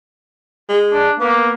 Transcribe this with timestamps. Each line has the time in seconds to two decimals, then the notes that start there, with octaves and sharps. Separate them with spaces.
0.69 G#3
0.93 D4
1.20 A#3 B3